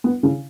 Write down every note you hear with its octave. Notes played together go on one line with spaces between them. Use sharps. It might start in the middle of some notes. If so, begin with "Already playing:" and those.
B3
C#3